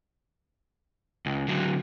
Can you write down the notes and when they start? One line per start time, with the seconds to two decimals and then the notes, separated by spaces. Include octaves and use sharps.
1.26 C#2
1.48 D3 F#3